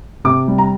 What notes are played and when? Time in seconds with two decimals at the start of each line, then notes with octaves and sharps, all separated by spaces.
0.24 C3 D6
0.48 G3
0.58 A#5